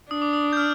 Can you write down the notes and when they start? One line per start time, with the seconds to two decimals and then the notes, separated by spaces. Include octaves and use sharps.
0.11 D4 D#6
0.22 D6
0.33 D#6
0.53 G6
0.57 F6